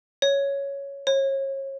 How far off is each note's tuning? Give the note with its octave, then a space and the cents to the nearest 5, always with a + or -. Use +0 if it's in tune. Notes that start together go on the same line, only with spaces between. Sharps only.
C#5 +5
C#5 -35